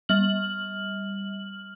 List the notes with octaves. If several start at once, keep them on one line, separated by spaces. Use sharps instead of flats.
G3 F6 F#7